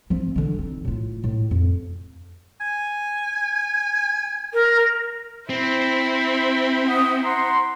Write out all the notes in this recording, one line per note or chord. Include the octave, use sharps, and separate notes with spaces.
F3 C4
D3 E3
C4 D#4
A2 F4
A2
F2
G#5
A#4
C4 E4 C5
F#5 D#6
F#5 A#5 C6